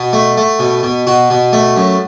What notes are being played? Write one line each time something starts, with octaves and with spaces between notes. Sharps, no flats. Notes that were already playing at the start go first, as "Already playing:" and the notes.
Already playing: B2 F#4
A3
A3
B2
B2
B2 F#4
B2
A3
F#2